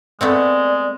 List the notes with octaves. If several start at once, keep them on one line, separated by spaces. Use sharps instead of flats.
G#3 A3 B3 C4 D5